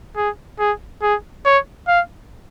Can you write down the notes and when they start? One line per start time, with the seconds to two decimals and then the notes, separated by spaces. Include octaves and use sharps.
0.16 G#4
0.59 G#4
1.02 G#4
1.45 C#5
1.88 F5